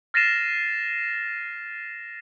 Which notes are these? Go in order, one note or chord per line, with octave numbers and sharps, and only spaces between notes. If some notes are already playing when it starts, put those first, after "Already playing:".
F6 A6 A#6 C7 D#7 E7